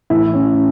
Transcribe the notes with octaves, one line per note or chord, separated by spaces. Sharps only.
A2 E3 E4
C#4